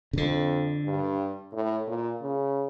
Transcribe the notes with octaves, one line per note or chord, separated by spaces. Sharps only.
C#3
F2 D3
G2
A2
A#2
C#3